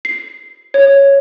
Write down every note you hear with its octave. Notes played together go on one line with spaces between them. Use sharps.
C7
C#5